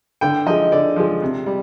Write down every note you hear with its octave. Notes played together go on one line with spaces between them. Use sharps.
D3 G5
F3 G#3 D#5
D3 D5
F3 G#3
C3
G3